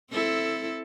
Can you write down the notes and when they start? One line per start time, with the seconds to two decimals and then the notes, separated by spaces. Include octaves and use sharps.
0.11 C4 E4 A4